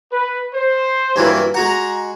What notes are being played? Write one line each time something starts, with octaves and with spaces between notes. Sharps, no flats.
B4
C5
G2 E3 F#3 A#3 E4
G#3 F#4 F#5 A#5